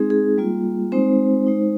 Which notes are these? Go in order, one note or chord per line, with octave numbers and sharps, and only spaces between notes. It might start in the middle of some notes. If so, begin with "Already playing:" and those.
Already playing: G#3 C4 D#4 G#4
G#4
G3 A#3 F4
G#3 C4 D#4 C5
G#3 D#4